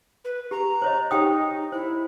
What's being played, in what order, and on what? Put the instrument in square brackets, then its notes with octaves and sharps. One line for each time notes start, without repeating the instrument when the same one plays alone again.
[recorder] B4
[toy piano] G4 [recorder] A#5
[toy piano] C5 C#5 D#5
[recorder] D#4 [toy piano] G4 G5 D#6
[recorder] E4 [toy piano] C5